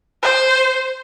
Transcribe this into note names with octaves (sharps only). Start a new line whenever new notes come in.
C5